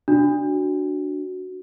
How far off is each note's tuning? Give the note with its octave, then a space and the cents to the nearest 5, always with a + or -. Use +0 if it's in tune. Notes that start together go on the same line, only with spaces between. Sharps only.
D4 +0 F#4 +0